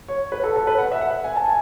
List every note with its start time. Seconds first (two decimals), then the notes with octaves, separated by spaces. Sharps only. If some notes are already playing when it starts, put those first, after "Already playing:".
0.08 C#5
0.32 B4
0.44 A4
0.56 A4
0.67 B4
0.78 F#5
0.91 E5
1.01 F#5
1.24 G#5
1.36 A5
1.46 G#5